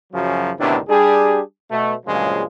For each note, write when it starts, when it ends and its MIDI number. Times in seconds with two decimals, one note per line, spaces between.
0.13 0.51 42
0.13 0.51 49
0.13 0.51 53
0.13 0.51 54
0.59 0.78 38
0.59 0.78 45
0.59 0.78 48
0.59 0.78 51
0.59 0.78 59
0.59 0.78 62
0.88 1.41 55
0.88 1.41 62
0.88 1.41 67
0.88 1.41 68
1.71 1.93 47
1.71 1.93 57
2.06 2.43 43
2.06 2.43 46
2.06 2.43 49
2.06 2.43 53
2.06 2.43 54
2.06 2.43 56